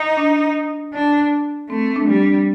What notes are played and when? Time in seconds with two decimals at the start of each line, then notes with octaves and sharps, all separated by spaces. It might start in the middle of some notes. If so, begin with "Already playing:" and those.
Already playing: D#4
0.17 D4
0.94 D4
1.70 A3 C4
1.96 D4
2.09 G3
2.22 D4